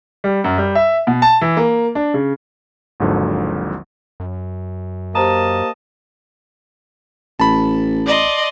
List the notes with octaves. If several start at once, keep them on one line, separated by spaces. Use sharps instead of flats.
G3
F#2
G3
E5
B2
A5
E3
A#3
D4
C#3
G#1 D#2 G#2 D3 F3 F#3
F#2
A#3 G4 C5 D#5 A5 A#5
A1 A5 B5
D5 D#5 C6